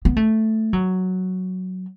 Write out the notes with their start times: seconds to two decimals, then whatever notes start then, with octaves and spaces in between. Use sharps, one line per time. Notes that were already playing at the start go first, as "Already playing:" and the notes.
0.05 B3
0.17 A3
0.73 F#3